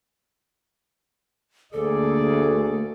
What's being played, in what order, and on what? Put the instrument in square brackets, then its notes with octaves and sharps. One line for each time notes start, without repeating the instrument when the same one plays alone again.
[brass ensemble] D2 G#4 D5 [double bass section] D3 A3 A#3 [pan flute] A4